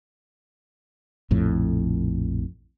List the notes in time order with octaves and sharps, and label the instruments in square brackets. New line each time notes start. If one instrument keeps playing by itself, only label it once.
[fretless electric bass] A#1 F2 A2